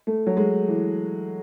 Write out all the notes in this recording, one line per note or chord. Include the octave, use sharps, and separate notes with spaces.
A3
F#3
G#3
E3